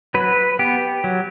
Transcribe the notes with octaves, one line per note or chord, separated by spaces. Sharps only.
F#3 B4
B3 G4
F#3